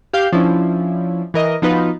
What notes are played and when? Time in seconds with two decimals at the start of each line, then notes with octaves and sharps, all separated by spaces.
0.13 G4 F5 G6
0.32 F3 C#4 D4 E4
1.34 E3 A#4 D#5
1.62 F3 B3 D#4 F4 F#4 B4